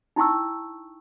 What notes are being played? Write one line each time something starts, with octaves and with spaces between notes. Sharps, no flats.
D#4 E4 G5 C#6 E6